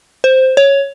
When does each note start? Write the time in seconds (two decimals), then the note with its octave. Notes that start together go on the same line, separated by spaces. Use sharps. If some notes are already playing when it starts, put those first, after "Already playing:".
0.24 C5
0.57 C#5